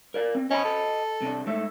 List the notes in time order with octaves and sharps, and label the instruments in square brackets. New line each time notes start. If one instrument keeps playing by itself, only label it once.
[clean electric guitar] A#4 D5 F5
C4
[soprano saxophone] C#4 [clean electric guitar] D#5 A5 B5
[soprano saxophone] A4
[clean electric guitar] C3 D4
G#2 A3 E5